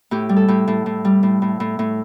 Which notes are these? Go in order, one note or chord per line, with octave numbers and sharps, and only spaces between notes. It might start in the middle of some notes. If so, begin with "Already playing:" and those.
A2 G4
G3
A4
A2 G4
A2
A2
G3
A2
A2
A2
A2